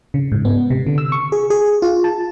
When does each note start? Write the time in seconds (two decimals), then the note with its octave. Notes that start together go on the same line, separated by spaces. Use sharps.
0.14 C#3
0.32 G#2
0.45 B3
0.70 C3
0.87 D3
0.98 E6
1.12 C#6
1.32 G#4
1.50 G#4
1.82 F4
2.04 A5